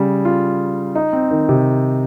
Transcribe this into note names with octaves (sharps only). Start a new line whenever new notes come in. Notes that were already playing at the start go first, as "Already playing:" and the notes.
Already playing: C#3 G3
F4
D#4
C4
D#3
C3